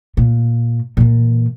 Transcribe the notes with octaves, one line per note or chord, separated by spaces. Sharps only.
A#2
A#2 E3